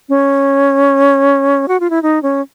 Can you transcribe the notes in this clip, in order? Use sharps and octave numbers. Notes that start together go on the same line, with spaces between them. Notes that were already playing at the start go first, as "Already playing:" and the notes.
C#4
F#4
F4
E4
D#4
C#4